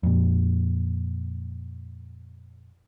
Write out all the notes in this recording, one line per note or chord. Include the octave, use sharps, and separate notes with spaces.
F2 A#2